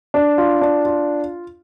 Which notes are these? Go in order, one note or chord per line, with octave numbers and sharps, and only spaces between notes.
D4
F4
D4
F4